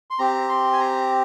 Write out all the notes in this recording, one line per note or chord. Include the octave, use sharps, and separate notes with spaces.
C6
C4 G4 A#5
C6
G#5
A#5